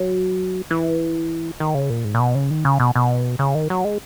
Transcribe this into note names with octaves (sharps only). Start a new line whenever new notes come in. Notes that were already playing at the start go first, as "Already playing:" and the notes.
Already playing: F#3
E3
D#3
C#3
A#2
G#2
A#2
B2
C#3
D#3
C#3
B2
B2
C#3
D#3
F#3
G#3